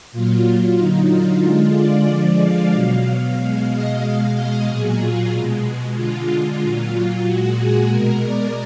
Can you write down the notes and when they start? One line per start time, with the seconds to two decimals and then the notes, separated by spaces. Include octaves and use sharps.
0.12 A#2 F#3 F4
0.77 D3 F#3 D#4
1.09 F4
1.41 D3 G#3
1.74 D5
2.07 D3 F3 G#3 D5
2.39 F5
2.72 B2 F#3
3.04 F5
3.36 B2 G#3 F5
3.69 D#5
4.01 B2 G#3 F5
4.33 D#5
4.65 A#2 F#3 G#4
4.98 F4
5.31 B2 G#3
5.95 D3 G#3 F4
6.61 A#2 F#3 F4
6.93 F4
7.25 A#2 G#3 F#4
7.57 G#4
7.90 B2 G#3 A#4
8.23 D5